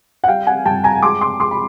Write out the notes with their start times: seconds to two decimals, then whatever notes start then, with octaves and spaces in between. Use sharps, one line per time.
0.24 F#5
0.28 G3 F5 G5
0.47 F#5 G#5
0.66 G2 G5 A5
0.84 G#5 A#5
1.03 G#3 C6 D6
1.21 C6 D6
1.40 G#3 C6 D6
1.51 B5